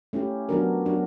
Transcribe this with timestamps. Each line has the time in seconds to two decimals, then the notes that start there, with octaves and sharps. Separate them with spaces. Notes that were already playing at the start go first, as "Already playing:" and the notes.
0.13 A3 C#4 E4 G4
0.49 F#3 B3 D4 F#4 A#4
0.85 F#3 B3 D4 F#4 A#4